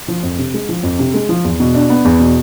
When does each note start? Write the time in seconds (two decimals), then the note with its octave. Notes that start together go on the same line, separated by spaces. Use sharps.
0.08 F3
0.23 F2
0.38 C3
0.54 G#3
0.69 F3
0.83 F2
0.99 C3
1.14 G#3
1.29 F3
1.44 E2
1.60 B2
1.75 D4
1.90 B3
2.05 E2
2.20 B2